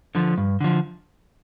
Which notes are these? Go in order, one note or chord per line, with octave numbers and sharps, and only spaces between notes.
D3 F3
G2
D3 F3